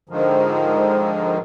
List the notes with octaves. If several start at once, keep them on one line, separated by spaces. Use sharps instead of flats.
G#2 D3 D#3 F3